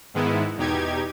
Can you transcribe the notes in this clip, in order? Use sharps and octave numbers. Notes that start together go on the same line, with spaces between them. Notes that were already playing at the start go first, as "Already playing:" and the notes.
G#2 D#3 G#3 B3 E4
E2 B2 D#4 G4 G#6